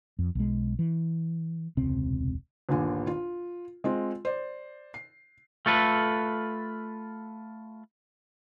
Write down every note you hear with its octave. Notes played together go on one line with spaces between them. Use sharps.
F2
B1 G#3
E3
E1 C#2 C3 C4
G1 D#2 A#2 D3 G#5
F4
G#3 C4 F4
C5 D5
C7
A3 F4 A4 B4